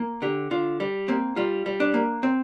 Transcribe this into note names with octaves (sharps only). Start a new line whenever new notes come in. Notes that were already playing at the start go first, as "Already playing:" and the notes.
Already playing: A#3
D3 G4
D3 F4
G3
A#3 C4
G3 F4
G3
D4
A#3
C4